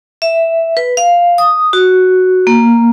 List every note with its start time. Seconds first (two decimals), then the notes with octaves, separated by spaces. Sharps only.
0.22 E5
0.77 B4
0.97 F5
1.38 D#6
1.73 F#4
2.47 A#3